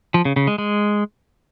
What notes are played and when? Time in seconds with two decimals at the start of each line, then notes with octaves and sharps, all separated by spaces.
0.14 F3
0.25 C#3
0.36 C#3
0.47 G#3
0.58 G#3